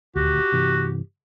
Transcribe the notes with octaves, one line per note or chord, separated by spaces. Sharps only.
D#1 G#1 D2 F#4 G4
G2 C3 E3